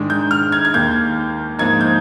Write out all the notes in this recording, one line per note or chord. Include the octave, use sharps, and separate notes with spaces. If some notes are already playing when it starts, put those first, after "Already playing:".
Already playing: G#2 D#3 G#3 D4
G6
F6
G#6
G#6
D#2 D#3 A#3 G6
G#2 F3 A#3 D#4 G#6
G6